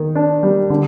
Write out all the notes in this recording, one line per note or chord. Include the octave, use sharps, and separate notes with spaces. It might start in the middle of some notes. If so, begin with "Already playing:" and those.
Already playing: D#3
D4
G3
D3